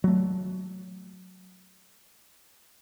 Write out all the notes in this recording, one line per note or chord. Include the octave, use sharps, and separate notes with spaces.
F#3 A3